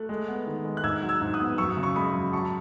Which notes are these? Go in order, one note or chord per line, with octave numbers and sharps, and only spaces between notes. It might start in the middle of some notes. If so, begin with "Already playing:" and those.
Already playing: A3 F#6
G#3
B3
D#3
G#3
F#6
G#2 E6 G#6
F#3
E6 G#6
G#2
D#6 F#6
B3
F#2 C#6 E6
C#3
C#6
G#3 B5 D#6
F#2
F#3 A5 C#6